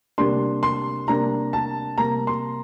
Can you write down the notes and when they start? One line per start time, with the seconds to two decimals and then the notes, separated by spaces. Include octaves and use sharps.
0.18 C3 G3 A#3 D4 C6
0.63 C6
1.08 C3 G3 A#3 D4 A#5
1.53 A5
1.98 C3 G3 A#3 A#5
2.27 C6